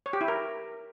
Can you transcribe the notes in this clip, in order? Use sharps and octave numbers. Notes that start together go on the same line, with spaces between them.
C#5
G4
E4
A#4